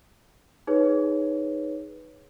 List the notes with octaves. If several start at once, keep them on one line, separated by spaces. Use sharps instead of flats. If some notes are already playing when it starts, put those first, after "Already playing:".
D#4 G#4 B4 C#5